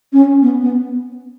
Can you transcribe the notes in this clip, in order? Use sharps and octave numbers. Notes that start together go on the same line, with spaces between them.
C#4
B3
B3